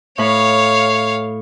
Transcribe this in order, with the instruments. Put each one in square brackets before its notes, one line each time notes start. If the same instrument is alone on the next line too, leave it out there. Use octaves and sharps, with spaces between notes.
[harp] A2 B5 [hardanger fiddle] C#5 F5